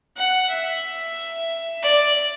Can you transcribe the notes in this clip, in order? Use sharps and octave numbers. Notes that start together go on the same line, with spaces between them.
F#5
E5
D5